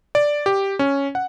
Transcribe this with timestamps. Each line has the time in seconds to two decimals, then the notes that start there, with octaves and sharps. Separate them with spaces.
0.15 D5
0.46 G4
0.79 C#4
1.15 F#5